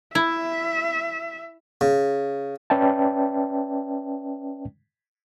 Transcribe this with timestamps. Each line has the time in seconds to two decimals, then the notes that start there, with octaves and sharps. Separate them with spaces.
0.15 E4 E5
1.81 C#3
2.70 C#4 B4 D5 E5 G5 A5